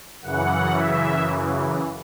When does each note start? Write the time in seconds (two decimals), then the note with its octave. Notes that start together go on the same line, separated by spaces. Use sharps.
0.22 F#2 C#3 E3 F#5
0.72 E5